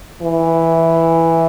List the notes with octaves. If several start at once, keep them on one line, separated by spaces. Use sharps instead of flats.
E3